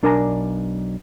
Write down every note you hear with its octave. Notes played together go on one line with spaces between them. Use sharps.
B1 D4 A#4 D5 G#5 A#5